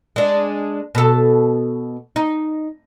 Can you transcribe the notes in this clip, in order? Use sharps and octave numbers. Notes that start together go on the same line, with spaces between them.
G#3 D4
B2 A4
D#4